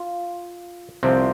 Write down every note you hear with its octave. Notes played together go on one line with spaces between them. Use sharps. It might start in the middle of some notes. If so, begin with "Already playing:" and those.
Already playing: F4
C2 C3 F3 C4